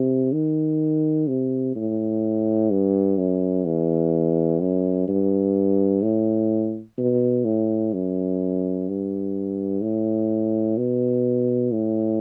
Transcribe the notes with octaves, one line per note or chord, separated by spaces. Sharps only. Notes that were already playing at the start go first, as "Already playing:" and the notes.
Already playing: C3
D#3
C3
A2
G2
F#2
E2
F#2
G2
A2
B2
A2
F#2
G2
A2
B2
A2